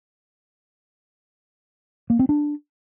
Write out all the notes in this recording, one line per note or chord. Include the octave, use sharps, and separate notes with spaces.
A#3
C4
D4